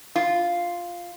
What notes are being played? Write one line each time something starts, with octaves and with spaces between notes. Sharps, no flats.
F4